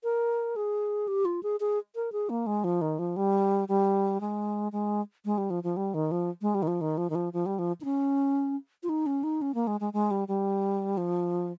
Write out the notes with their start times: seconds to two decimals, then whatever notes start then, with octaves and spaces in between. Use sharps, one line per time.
0.04 A#4
0.56 G#4
1.08 G4
1.25 F4
1.43 G#4
1.60 G#4
1.95 A#4
2.12 G#4
2.30 A#3
2.47 G#3
2.64 F3
2.81 D#3
2.99 F3
3.16 G3
3.68 G3
4.21 G#3
4.72 G#3
5.25 G#3
5.38 G3
5.50 F3
5.63 F3
5.77 G3
5.94 D#3
6.11 F3
6.42 G#3
6.55 G3
6.63 D#3
6.68 F3
6.81 D#3
6.98 F3
7.10 D#3
7.15 F3
7.33 F3
7.46 G3
7.59 F3
7.81 D#4
7.85 C#4
8.83 F4
8.89 D#4
9.06 C#4
9.24 D#4
9.42 C#4
9.54 A#3
9.67 G#3
9.80 G#3
9.93 G#3
10.11 G3
10.28 G3
10.97 F3